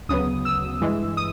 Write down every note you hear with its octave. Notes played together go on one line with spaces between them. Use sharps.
D2 C#3 F#3 B3 D#6
E6
G2 E3 G#3
D#6